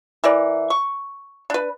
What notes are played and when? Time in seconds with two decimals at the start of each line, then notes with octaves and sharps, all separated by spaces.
0.24 E3 A#4 D5
0.70 C#6
1.50 D4 B4